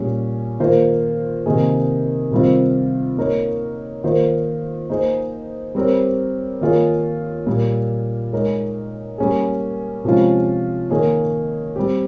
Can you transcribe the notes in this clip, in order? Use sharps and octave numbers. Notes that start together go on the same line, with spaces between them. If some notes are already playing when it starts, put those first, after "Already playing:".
Already playing: A#2 G3 C#4 G#4
D#3 A#3 F4 C5
C3 D#3 A#3 D#4 G#4
C3 D#3 G3 C4 F4
A#3 D#4 A#4 C#5
D#3 A#3 F4 C5
A#3 D#4 G#4 C5
G3 C4 G4 A#4 C#5
D#3 A#3 F4 G#4 C#5
A#2 G3 A#3
G#3 D#4 A#4 C#5
G3 A#3 C#4 G#4
C3 F3 G#3 C#4 F4
D#3 A#3 D#4 G#4 C#5
G3 C4 G4